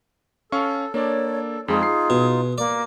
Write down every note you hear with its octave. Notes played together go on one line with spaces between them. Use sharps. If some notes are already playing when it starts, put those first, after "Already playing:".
C#4 A4 F5 C#6
A#3 D4 A4 C#5 D5
F2 G#3 D#4 F4 G#4
C7
B2
A#3 D5